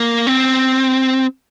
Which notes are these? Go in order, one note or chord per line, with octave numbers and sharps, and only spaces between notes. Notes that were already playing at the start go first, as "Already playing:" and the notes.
Already playing: A#3
C4